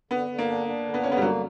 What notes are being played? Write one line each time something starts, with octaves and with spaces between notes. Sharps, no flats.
D3 B3
D3
A#3
D4
D4
D3
B3
D3 C#4
B3
G3
F#3 A#3